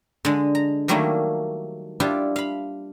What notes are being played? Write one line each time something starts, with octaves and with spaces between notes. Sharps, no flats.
D3 G#3
A#5
D#3 F#3 G3 A3 A#3 E4
G3 D4 E4 F4 G4
F5 B5